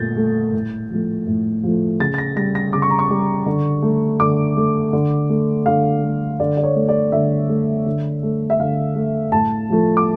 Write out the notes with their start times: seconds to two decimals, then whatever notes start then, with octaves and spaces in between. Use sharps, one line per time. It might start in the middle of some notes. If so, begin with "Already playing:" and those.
Already playing: A#2 A3 G6 A6
0.16 A3
0.53 A2
0.90 F3 A3
1.27 A2
1.63 F3 A3
2.00 C#3 A6
2.14 A6
2.18 A#6
2.36 G3 A#6
2.55 A#6
2.73 C#3 D6
2.82 C#6
2.90 A#5
2.99 C#6
3.10 G3
3.46 D3
3.82 A3
4.20 D3 D6
4.57 A3
4.93 D3
5.30 A3
5.66 D3 F5
6.02 A3
6.40 D3 D5
6.57 D5
6.64 C#5
6.76 A3
6.89 D5
7.12 D3 E5
7.49 A3
7.86 D3
8.23 A3
8.50 E5
8.60 D3 F5
8.95 A3
9.32 A2 A5
9.69 F3 A3
9.97 D6